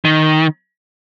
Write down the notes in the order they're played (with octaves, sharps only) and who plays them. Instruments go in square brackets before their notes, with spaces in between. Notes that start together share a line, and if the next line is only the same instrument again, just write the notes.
[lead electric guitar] D#3